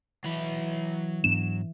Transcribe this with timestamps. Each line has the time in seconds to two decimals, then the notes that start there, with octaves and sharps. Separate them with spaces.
0.24 E3 F#3 B5
1.24 G#2 B3 D4 E7